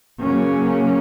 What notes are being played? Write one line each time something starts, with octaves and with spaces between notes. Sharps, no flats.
C#3 F#3 A#3 C#4